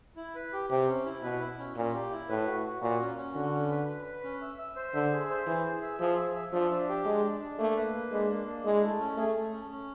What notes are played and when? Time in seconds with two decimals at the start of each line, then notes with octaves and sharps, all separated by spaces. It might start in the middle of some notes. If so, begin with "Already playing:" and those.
0.16 E4
0.35 B4
0.53 G4
0.70 C3 G4
0.88 C#4
1.06 E4
1.23 B2 B4
1.40 E4
1.58 C#4
1.76 A#2 C#4
1.93 G4
2.12 E4
2.29 A2 B4
2.46 F#4
2.65 F#4
2.82 A#2 F#4
3.00 C#4
3.18 C#4
3.35 D3 F#4
3.53 C#4
3.71 B4
3.88 B4
4.05 B4
4.23 C#4
4.41 E5
4.58 E5
4.76 C5
4.94 D3 E5
5.12 G#4
5.30 C5
5.47 E3 G#4
5.64 G#4
5.82 E5
6.00 F3 G#4
6.17 E5
6.35 E5
6.52 F3 D4
6.70 D4
6.89 G4
7.06 G#3 D4
7.23 D4
7.41 D4
7.59 A3 A#3
7.76 B4
7.94 A#3
8.11 G#3 D4
8.29 A#3
8.47 D4
8.65 G#3 E4
8.83 A3
8.99 C#4
9.18 A3 G#4
9.35 A3
9.52 C#4
9.71 C#4